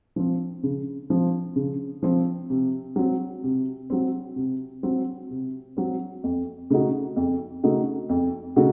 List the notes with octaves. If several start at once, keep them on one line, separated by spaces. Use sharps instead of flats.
F3 C4
C#3
F3 C4
C#3
F3 C4
C3
F#3 C4
C3
F#3 C4
C3
F#3 C4
C3
F#3 C4
F2
C#3 A3 D#4 F#4
F2
C#3 A3 D#4 F#4
F2
C#3 A3 D#4 F#4